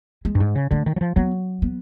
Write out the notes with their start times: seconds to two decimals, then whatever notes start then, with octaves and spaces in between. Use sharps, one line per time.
0.25 G#3
0.35 G2
0.40 G#2
0.56 C#3
0.71 D3 A3
0.86 D#3
0.96 F#3
1.01 F3
1.16 F#3 B3
1.62 B3